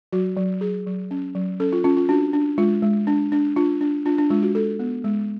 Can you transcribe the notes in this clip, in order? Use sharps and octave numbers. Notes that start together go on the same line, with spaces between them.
F#3 F#4
F#3
F#3 G#4
F#3
C#4
F#3
C#4 A4
F4
C#4 F4
F4
D4 F#4
D4
G#3 F4
G#3
D4
D4
D4 F4
D4
D4 F4
D4
G#3 F4
F#4
G#3 A4
B3
G#3